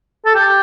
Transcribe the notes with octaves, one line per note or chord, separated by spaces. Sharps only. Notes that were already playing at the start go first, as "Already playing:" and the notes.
A4
G4